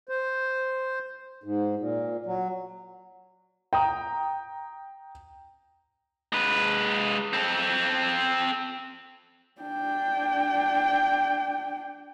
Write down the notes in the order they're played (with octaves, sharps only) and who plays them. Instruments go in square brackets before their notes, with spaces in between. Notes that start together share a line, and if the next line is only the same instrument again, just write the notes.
[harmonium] C5
G#2
A#2
F#3
[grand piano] G5 A#5 D#6
[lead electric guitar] G#3 B4
C4 A4
[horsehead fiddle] D4 G5